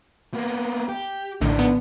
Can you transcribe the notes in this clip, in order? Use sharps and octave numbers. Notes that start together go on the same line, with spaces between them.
A#3 B3
G4
A#1 A2 D3 D#3 D4
B3